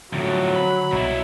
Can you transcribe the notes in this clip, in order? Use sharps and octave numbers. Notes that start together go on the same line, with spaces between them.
F2 A2 D3 F#3
B5
C2 B2 E4 C#5 A#5